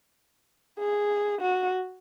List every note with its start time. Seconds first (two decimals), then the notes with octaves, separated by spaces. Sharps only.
0.79 G#4
1.42 F#4